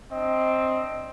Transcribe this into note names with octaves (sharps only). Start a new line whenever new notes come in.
C4 D4 D#5